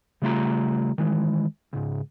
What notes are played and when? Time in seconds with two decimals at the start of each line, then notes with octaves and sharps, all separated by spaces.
0.22 C#3 G3 A3 F4 A#5
0.98 D#3 E3 G#3
1.73 C#2 G#2